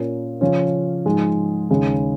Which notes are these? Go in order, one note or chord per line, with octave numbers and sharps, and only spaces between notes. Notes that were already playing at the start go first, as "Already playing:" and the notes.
Already playing: A#2 A#3 C#4
C#3 F3 C#4 F4 C#5
G#2 F3 G#3
D#2 C#3 G#3 C#4